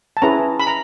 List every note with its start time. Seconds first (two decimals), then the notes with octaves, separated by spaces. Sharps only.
0.17 A5
0.22 C#4 E4 G#4 B4 A#5
0.60 B5
0.67 A#5